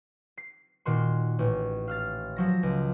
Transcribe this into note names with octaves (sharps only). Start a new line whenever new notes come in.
C7
A#2 D#3 F#4 C6
A1
F5 F6 A6
F3 F#3 A#6
C#2